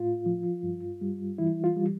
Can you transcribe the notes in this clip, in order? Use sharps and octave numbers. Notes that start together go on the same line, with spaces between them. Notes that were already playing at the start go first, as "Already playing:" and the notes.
Already playing: A2 F4
F3
G2
G3
E3 E4
F4
G3